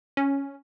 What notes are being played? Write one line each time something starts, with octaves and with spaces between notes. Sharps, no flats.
C#4